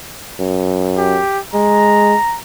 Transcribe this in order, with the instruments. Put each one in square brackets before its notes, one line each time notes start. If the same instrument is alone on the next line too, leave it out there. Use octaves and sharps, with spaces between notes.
[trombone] F#2
[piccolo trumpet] G4
[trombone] G#3 [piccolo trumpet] A#5